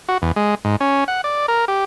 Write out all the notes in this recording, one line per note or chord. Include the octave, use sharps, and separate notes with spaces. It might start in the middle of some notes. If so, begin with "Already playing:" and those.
F#4
E2
G#3
G#2
C#4
F#5
D5
A#4
G4